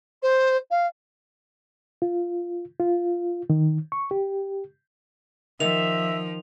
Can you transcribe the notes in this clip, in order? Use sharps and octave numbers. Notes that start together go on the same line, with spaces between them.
C5
F5
F4
F4
D#3
C#6
G4
D#3 F3 E5 F7